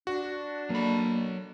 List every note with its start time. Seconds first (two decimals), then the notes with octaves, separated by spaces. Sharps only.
0.07 D4 F#4
0.70 F#3 A#3 A4 B5